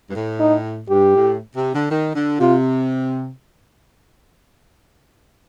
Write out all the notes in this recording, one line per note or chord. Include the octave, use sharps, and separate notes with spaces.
G2
A2
D#4
G2 G4
A2
C3
D3
D#3
D3
C3 F4